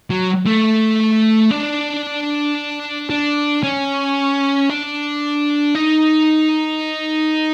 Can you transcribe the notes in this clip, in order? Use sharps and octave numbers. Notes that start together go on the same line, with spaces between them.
F#3
A3
D4
D4
C#4
D4
D#4